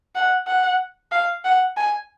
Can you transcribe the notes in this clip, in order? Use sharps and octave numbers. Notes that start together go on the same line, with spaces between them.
F#5
F#5
F5
F#5
G#5